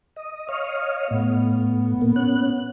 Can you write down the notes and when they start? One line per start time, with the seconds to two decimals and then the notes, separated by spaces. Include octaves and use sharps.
0.16 D#5
0.49 C#5 D#5 F5
1.11 A2 B3
2.02 A#2 A#3
2.16 C#4 F#6